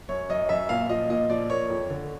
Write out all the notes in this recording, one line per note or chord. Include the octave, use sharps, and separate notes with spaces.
F#2 C#5
F#2 D#5
F#2 E5
A#2 F5
F3 D#5
A#2 D#5
F3 D5
A#3 C#5
F2
D3